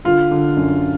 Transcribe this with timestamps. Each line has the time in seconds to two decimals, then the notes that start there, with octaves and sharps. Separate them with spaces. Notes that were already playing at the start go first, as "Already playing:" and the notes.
0.05 D3 F4
0.31 D3
0.57 F#2